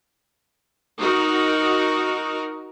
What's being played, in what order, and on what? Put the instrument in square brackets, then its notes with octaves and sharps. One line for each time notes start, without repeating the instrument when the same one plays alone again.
[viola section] D#4 F#4 A#4